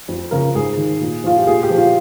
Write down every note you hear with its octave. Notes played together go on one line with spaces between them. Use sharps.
F2
C#3 F3 A#4
G#2 G#4
D#3
A#2
F3 F4
G4
A#2 G#4
G4
F3
F4